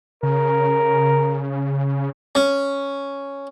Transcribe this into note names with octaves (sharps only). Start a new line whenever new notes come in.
C#3 A#4
C#4